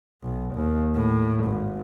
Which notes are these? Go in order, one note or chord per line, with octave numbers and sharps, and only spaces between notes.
B1
D#2
A2
G#1